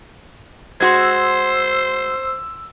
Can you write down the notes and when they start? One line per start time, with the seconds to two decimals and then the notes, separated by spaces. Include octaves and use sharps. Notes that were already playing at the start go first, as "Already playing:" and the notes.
0.81 G#3 F#4 C5 C6 E6 G#6